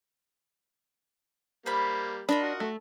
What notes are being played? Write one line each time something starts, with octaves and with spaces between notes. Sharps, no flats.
G3 A#3 C5 B5
D4 F4 A#4 D#5 B5
F#4
A3